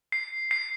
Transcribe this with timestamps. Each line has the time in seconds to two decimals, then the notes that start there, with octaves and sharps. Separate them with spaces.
0.12 C7
0.51 C7